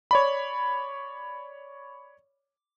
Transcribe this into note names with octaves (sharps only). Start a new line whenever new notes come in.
C#5 D5 B5